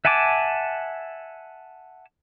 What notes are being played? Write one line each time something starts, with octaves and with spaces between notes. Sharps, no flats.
E5 F#5 G#5 A5 D6